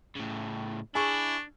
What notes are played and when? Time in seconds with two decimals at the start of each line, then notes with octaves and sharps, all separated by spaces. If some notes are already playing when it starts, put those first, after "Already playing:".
0.15 A2 C#3
0.95 D4 E4 G#4 C#6